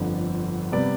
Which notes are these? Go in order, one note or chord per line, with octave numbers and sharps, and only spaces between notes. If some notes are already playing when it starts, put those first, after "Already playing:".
Already playing: G1 F2 D3 F3
C3 G3 B3 D5